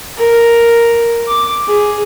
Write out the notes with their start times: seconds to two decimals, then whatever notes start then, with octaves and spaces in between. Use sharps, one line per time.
0.17 A#4
1.28 D6
1.67 G#4